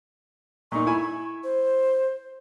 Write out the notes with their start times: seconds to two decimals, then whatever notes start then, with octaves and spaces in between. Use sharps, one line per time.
0.72 A#2 D#4 C#6
0.86 E4 G#5 B5
1.44 C5